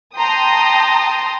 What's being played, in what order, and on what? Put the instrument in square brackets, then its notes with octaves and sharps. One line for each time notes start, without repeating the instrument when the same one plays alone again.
[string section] G5 A5 A#5 C6 D#6